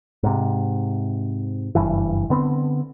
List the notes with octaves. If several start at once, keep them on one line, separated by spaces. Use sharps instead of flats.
G#2 C3
F#1 G2 E3
D3 B3 C4